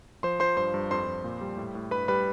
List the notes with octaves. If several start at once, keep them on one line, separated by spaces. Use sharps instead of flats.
F3 C5 C6
F3 C5 C6
G2 C5 C6
G2
F2 C5 C6
F2
A#2
G3
A2
A2
G2 B4 B5
G3 B4 B5